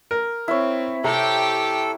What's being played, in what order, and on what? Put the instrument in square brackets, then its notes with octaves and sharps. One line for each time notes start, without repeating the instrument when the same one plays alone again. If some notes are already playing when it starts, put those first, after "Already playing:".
[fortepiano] A#4
[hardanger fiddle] C4 [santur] E4 C#5
[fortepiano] C3 [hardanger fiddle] G4 G5 [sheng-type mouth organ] A4 [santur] A#5